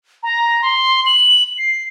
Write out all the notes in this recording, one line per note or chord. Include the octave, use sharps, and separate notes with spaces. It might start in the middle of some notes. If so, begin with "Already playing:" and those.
A#5
C6
F#7
C7